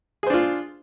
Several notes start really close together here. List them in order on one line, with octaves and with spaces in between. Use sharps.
G#4 C5 D4 F4